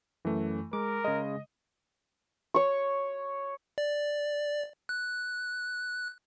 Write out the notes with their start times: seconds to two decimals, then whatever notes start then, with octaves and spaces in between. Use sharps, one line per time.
0.25 F#2 E3 A3
0.73 G#3 A#4 D6
1.04 C#3 G#3 D#5
2.54 C#5 C#6
3.78 D5
4.89 F#6